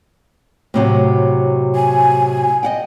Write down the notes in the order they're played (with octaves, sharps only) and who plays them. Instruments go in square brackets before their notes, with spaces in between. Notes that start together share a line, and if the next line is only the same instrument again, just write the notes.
[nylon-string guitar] A2 C3 F#3
[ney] G#5
[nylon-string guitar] D#5 F#5 G5